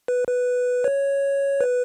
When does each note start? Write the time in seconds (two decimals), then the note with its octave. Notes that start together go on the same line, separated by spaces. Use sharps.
0.08 B4
0.28 B4
0.84 C#5
1.61 B4